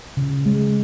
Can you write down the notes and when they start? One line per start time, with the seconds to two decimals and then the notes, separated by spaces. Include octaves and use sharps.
0.17 C#3
0.46 G#3